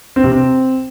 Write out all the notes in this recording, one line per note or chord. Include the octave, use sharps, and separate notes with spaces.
C4
C3
C4